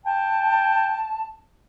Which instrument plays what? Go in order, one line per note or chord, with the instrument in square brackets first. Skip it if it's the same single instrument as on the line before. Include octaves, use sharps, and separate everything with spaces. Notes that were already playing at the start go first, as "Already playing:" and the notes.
[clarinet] G5 [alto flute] A5